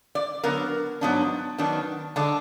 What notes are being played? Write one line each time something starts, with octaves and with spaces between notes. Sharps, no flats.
D5
D3 F#3 B3 A#4
G#2 F#3 B3 D4
D#3 F#3 B3 D4
D3 G#3 D4